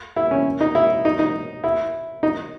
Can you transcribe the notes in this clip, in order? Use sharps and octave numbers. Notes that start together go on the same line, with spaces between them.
E4
C#4
D#4
E4
D#4
D#4
E4
D#4